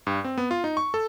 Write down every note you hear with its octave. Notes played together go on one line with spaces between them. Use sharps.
G2
C4
B3
F4
D#4
C#6
A4